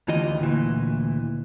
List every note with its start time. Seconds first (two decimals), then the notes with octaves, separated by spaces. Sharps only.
0.08 D2 E3 F4 G4 D#5
0.40 D2 A#2 E3